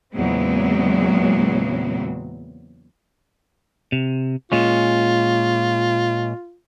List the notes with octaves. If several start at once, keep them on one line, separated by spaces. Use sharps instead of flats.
E2 A#2 C#3 F#3 G#3 C4
C3
A#2 G#3 C#4 F4